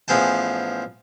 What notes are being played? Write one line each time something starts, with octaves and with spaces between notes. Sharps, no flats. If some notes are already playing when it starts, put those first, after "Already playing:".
A1 F3 B3 G#4 G5 A5